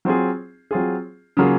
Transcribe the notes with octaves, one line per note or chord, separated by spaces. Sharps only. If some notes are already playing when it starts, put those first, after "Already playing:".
F#3 C4 F4 G#4
F#3 C4 F4 G#4
C#3 F#3 A#3 F4 G#4